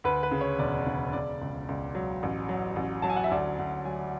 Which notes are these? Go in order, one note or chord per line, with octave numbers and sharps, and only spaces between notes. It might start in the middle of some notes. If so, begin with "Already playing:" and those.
D2 B4
B4
C#3
C#5
E1 D5
C#3
C#3 D5
C#2
C#2
F#3
A1
F#3
A1
F#3 A5
G#5
F#5
E5
D2 D5
D2
F#3 G#5